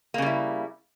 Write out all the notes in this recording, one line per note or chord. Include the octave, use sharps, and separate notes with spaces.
C#3 G3 A#3 E4